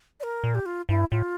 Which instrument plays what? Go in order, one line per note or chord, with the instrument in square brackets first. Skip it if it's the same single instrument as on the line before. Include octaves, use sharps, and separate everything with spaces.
[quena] D5
A#4
[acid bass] A#2
[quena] G4
F4
[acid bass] G2 [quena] E4
[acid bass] A2 [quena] F4